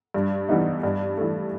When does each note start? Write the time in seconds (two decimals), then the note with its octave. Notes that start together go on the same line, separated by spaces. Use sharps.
0.14 G2
0.49 E3 G3 B3 D#4
0.83 G2
1.17 E3 A3